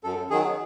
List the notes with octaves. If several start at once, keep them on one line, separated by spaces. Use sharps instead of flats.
F#2 A4
D#3 F#3 G#4